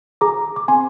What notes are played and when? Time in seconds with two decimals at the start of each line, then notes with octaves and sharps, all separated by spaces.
0.21 G#4 A#5 D6
0.56 D6
0.68 C4 G#5 C6